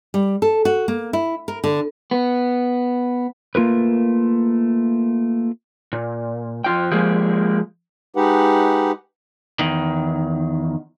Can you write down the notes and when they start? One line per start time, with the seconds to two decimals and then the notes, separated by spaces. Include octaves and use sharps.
0.14 G3
0.42 A4
0.65 F#4
0.88 A#3
1.13 E4
1.48 A#4
1.64 D3
2.11 B3
3.55 A3 A#3 F4 A#4 B4
5.93 A#2
6.64 F2 F4 G5
6.92 F3 G#3 A#3 G4
8.16 G#3 D#4 G4 B4 F#5
9.59 E2 D#3